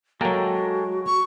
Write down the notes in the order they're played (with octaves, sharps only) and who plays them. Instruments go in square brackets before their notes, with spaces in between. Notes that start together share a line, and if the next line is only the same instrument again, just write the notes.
[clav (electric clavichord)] F#3 A#3 [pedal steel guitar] G#3 A4 G5 [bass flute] F#4
[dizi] C#6